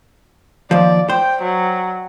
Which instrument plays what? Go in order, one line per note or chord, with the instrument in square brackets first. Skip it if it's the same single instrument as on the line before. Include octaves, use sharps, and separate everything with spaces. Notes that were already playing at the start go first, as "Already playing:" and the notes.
[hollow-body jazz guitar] D#2 F3 [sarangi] D5
[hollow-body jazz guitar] C5 [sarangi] G5
[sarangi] F#3